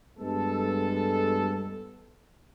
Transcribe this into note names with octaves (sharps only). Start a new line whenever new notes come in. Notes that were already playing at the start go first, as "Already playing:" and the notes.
G2 G#3 B3 A4